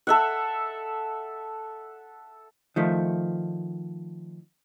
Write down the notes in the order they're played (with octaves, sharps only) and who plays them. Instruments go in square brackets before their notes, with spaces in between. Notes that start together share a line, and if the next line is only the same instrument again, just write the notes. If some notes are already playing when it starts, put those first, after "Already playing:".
[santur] A4 E5 F#5
[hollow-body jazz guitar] D#3 F3 A3